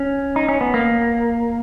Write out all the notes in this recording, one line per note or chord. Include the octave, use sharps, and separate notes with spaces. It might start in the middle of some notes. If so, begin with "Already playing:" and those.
Already playing: C#4
D#4
C#4
B3
A#3